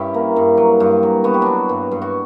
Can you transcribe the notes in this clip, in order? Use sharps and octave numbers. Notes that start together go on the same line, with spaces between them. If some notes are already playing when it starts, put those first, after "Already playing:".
Already playing: G2 C#4 E4 G4
A#3
G2
F#3
G2
F#3
B3 F#4
G4
F#3 D4 F#4
G2
G2
F#4